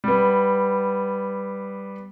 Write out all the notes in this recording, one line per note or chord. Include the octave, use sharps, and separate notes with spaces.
G3 B3